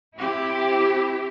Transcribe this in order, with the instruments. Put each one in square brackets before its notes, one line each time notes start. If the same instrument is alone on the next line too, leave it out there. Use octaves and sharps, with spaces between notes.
[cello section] C4 E4 G4